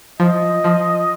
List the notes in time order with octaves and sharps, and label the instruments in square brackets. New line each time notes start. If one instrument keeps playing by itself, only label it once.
[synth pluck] F3 [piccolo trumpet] D#5
[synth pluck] F3